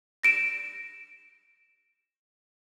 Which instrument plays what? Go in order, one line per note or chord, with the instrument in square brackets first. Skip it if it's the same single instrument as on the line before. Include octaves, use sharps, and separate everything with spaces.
[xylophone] A#6 D7 E7